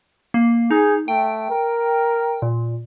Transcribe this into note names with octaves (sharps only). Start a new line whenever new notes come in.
A#3
D#4 G#4
A3 G5
A#4
A#2